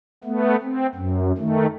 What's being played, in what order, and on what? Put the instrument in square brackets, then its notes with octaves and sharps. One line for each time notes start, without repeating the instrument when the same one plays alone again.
[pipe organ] A3 B3
C4
F#2
D#3 A3